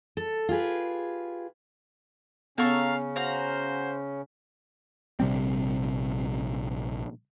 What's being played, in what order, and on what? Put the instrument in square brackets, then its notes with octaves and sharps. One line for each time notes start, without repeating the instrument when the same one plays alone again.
[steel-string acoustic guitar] A4
F4 G4 G#4 B4
[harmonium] C#3 C#4 [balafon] B3 [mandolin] A4 A#5 C#6 [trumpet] F5
[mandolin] F#4 F5 A#5 [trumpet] C5
[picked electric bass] A#1 C3 G3 C4